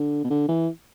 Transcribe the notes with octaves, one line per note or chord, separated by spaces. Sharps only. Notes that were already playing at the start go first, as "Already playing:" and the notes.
Already playing: D3
B2
D3
E3